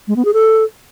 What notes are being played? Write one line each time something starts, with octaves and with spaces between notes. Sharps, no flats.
G#3
B3
G#4
A4